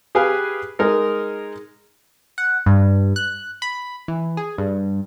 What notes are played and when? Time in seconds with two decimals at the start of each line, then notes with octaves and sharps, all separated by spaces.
0.15 G4 G#4 B4 F5 G#5
0.79 G#3 D#4 A#4
2.38 F#5
2.66 G2
3.16 F#6
3.62 B5
4.08 E3
4.37 G#4
4.58 G2